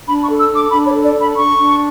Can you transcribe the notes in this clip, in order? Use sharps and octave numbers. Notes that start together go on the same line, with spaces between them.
D4 B5
C#6
A4
E6
D4
D6
D4 B5
C#5
A4
D5
D4
B5
D4 C#6
D4